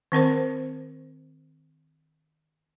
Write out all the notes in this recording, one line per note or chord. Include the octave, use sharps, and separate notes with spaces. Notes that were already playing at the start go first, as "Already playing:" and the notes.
D#3 C4 A#4 C5